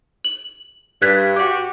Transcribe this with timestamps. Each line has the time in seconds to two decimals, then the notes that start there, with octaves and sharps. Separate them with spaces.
0.25 F#7
1.02 G2 F#6 G#6 B6
1.37 F#4 G4